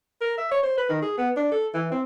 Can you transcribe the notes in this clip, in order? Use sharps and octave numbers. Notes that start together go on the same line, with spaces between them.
A#4
E5
C#5
C5
B4
D#3
G#4
B3
D4
A4
E3
C4